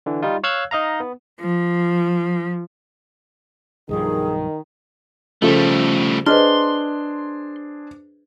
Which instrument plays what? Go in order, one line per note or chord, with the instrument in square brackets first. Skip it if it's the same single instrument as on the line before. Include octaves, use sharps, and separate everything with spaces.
[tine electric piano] D3 E3
G3 D#4 F4
C#5 F5 E6 F#6 G#6
D#4 D#5 F5 A#5
B3
[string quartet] F3
[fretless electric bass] B1 G2 F3 [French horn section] D#3 [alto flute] G#4
[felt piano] C#3 F3 [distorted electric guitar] G3 A3 [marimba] A4
[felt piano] D4 G#4 C5 [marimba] B4 D#5 F6 [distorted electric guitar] C6